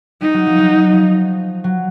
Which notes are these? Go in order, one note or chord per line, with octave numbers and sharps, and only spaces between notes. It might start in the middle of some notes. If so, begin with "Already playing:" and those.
G3 D#4
F#3
F3
F#3
F3
F#3